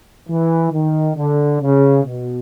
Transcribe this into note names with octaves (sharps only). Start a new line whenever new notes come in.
E3
D#3
D3
C#3
B2